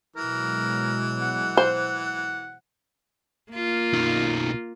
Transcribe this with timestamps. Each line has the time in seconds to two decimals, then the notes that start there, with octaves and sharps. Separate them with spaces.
0.16 B2 E3 F#3 G#3 A#4
1.22 F#5
1.57 C5
3.52 A#3 F4
3.94 B1 D#3